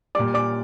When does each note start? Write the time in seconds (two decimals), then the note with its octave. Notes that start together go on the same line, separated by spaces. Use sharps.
0.15 A#2 G3 D5 D6
0.34 D5 D6